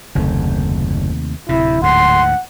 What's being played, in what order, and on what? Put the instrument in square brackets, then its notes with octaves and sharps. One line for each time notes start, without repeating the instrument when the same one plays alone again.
[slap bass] F#1 [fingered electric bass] D#2 C3 A3
[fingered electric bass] D1 [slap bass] C3 [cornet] E4
[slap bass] D2 G#2 [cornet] F#5 [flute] C6